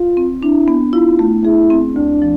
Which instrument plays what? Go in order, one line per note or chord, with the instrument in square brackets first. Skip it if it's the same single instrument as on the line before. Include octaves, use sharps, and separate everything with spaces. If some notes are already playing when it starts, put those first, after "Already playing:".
Already playing: [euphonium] F4
[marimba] C4
[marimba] D4 [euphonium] E4
[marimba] B3
[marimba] E4 [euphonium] F4
[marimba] A3
[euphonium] E4 [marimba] G#4
[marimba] C4
[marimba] D2 [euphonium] D4
[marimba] F3